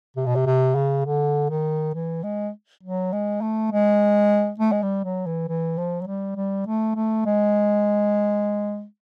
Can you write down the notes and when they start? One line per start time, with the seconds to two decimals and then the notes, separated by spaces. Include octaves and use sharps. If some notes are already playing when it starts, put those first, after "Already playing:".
0.16 C3
0.26 B2
0.35 C3
0.46 C3
0.75 C#3
1.05 D3
1.50 D#3
1.94 E3
2.23 G#3
2.83 F#3
3.12 G#3
3.41 A3
3.71 G#3
4.59 A3
4.72 G#3
4.82 G3
5.04 F#3
5.26 E3
5.48 E3
5.77 F3
6.01 F#3
6.07 G3
6.36 G3
6.66 A3
6.95 A3
7.25 G#3